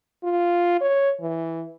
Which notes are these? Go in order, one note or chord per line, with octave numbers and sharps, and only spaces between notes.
F4
C#5
E3